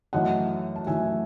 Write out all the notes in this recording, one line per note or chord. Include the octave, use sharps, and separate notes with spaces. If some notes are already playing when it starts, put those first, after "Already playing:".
F#2 E3 A3 D#5 F#5
A5
F#2 E3 A3 E5 G#5